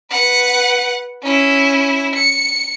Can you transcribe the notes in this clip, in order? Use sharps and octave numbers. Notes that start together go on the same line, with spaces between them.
B4 F#5
C#4 E4
C#7